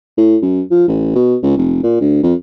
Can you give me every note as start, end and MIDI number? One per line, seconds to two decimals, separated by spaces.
0.17 0.37 45
0.42 0.61 42
0.71 0.86 53
0.88 1.12 33
1.15 1.36 47
1.43 1.56 37
1.57 1.81 29
1.83 1.96 46
2.00 2.21 38
2.23 2.34 41